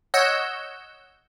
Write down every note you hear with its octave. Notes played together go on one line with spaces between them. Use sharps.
C#5 D#5 F#5 E6 G6